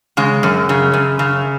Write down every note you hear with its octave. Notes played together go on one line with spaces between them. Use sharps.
C#3 G#3
F#2
C#3
F#2
C#3